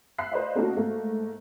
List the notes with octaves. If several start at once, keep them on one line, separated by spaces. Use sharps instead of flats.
E5 F5 B5 F#6 C7
B4 C5 D5 D#5 F5
A3 A#3 C#4 D#4 F#4 A4
G#2 A3 A#3